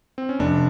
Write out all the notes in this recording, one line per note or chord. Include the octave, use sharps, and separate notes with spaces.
C4
C#4
F1 D4